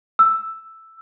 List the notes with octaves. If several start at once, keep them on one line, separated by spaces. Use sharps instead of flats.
E6